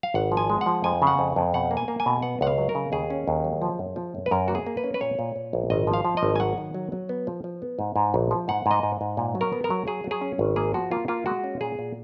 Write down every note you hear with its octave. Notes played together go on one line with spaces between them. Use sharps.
F5
G#1 F#5
F3
G#5
G#3
F#5
F3
F2 G#5
C#3
F#5
F2
F2
B2 F#5
A#3
G#5
A#3
G#5
B2
B3 F#5
C#2 F#5
F5
F#3
A#4
C#3
D#2 G#4
C#4
D#2
F#3
F3
F#2
F3
F#2
B4
F#2 A#4
A#3 F#4
G#4
A#3
B4
C#4
B4
A#2 C#5
A#2
A#2
A#1
G#1 D#5
F3
F5
F3
D#5
G#1
G#5
F#3 F#5
D#3
F#3
F#3
B3
F3
F3
B3
G#2
G#2
A#1
F3
G#2 F#5
G#2
D#5
G#2
G#2
A#2
F#3
A#4
B3
A#4
F#3
F#3 G#4
F#3
G#4
C#4
G#1
A#3 G#4
F3 F#4
A#3 F4
A#3 F4
G#3 F#4
C#4
A#2 G#4
A#2